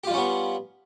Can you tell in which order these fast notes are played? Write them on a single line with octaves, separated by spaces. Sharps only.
G4 F4 G3 C#4 B3